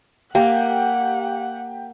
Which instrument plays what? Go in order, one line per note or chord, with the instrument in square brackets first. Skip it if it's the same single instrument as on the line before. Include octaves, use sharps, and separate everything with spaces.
[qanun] A#3 [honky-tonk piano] G4 [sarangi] F#5